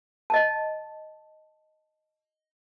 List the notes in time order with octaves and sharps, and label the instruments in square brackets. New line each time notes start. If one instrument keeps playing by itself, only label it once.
[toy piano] D#5 A5